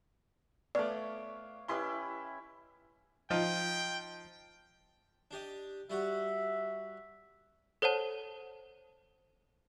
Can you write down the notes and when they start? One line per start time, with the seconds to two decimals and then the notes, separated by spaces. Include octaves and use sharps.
0.75 A3 B3 C#5 D5 F5 D6
1.68 C#4 E4 G4 B4 D#5 C6
3.30 F3 D#4 F4 G5
5.31 D4 G4 D#5
5.90 G3 F#4 E5 F#5
7.82 A4 C5 C#5 F#5 A5